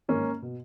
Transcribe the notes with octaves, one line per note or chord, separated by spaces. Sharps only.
G#2 D#3 A#3 C#4
B2